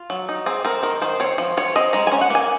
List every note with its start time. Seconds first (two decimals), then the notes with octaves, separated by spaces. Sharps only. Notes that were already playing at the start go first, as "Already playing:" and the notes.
Already playing: F4
0.10 F#3
0.29 D#4
0.46 C4 G#4
0.65 C4 A#4
0.83 D#3 A#4
1.02 D#3 C5
1.20 C4 C#5
1.38 F3
1.57 F3 C#5
1.76 C4 D#5
1.93 G#3 A#5
2.07 C#4 G#5
2.21 F#5
2.30 A#3 G#5